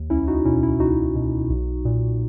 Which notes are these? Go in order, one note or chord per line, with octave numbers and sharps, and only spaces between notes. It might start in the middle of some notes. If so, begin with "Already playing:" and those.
Already playing: D#2
C#2 C#4 E4
D#4 F#4
B2 C#4 E4
C#4 E4
C#2 D#4 F#4
B2
B1
A#2